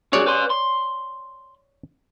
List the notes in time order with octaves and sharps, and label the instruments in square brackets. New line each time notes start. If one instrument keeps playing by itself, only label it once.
[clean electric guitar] G2 F#3 G#4 [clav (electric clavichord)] C#5 D5
[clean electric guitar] B4 G#5 C6
C6